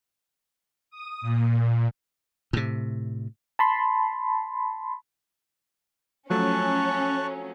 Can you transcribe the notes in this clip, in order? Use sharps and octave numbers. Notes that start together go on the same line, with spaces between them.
D#6
A#2
A2 C3
A5 B5 C6
F3 F#3 A3 C#4 A5 C#6 F#6